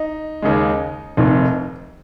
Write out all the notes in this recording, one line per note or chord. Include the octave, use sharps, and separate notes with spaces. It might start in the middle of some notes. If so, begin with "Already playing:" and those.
Already playing: D#4
D#2 C#3 G#3
F1 F2 D#3